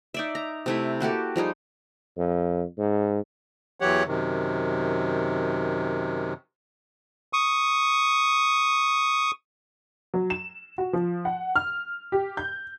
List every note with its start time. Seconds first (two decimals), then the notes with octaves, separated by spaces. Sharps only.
0.14 D#4 D5 E5
0.35 A#5
0.66 C3 A3 E4
1.00 A#3 F#4 G4 A4
1.36 F3 G3 D#4 G#4
2.18 F2
2.78 G#2
3.80 E2 E3 F#3 G4 C#5 F#5
4.07 F#2 C3 D#3
7.33 C#6 D#6
10.14 F#3
10.30 E7
10.78 F#4
10.93 F3
11.25 F#5
11.56 F6
12.12 G4
12.37 G6